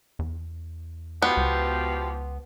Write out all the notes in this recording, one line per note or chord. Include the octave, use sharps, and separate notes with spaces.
E2
B2 F3 B3 G4
C#2